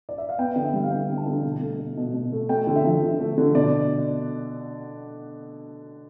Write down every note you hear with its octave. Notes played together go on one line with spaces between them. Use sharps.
D5
E5
F5
B3 G5
D3
E5
G3
F5
D3 G5
B3
A5
D3
B2
A3
A3
B2
B2
A3
A3 G5
D3
E5
F3
D3
A3
D3
B2 D5